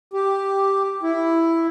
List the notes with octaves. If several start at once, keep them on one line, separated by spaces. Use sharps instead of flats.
G4
E4